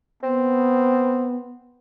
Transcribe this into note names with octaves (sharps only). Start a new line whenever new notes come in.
B3 C4